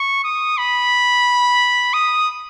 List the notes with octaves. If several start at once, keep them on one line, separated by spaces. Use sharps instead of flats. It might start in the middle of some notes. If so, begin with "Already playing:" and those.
Already playing: C#6
D#6
B5
D#6